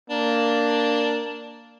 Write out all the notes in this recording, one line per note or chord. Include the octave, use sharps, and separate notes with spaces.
A#3 D4